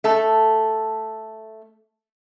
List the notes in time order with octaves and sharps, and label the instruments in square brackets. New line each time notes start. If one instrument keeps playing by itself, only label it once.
[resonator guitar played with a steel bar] A3 A4 A5